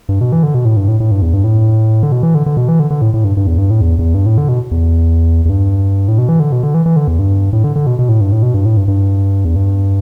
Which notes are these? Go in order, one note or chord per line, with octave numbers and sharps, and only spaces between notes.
G2
B2
E3
D3
B2
A2
G2
A2
A2
G2
E2
G2
A2
D3
B2
E3
D3
D3
B2
E3
D3
D3
A2
A2
G2
G2
E2
G2
A2
E2
E2
G2
A2
D3
B2
E2
E2
G2
A2
B2
E3
D3
B2
D3
E3
E3
D3
E2
G2
A2
D3
D3
B2
B2
A2
G2
A2
B2
G2
A2
G2
G2
E2
G2